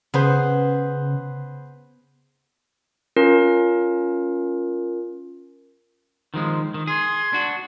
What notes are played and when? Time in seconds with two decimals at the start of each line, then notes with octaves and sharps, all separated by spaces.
0.14 C#3 B3 G#4 B4 C5
3.16 C#4 F4 A#4
6.34 D#3 F3 G#3
6.74 D#3
6.87 G#4 C6 G#6
7.33 D4 F#4